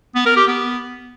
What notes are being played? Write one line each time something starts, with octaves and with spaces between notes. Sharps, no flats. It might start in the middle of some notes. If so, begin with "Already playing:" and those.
B3
A#4
G4
B3